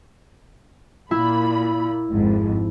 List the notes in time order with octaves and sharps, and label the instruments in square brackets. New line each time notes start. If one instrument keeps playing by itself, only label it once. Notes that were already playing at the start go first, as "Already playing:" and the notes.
[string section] A#2 B5 [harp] E4
[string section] G#1 F2 G#2